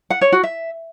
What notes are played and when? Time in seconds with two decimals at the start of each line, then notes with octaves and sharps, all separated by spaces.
0.10 F#5
0.21 C#5
0.32 F#4
0.43 E5